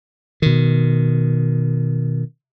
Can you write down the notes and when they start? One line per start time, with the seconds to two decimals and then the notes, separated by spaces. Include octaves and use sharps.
0.42 B2 D#3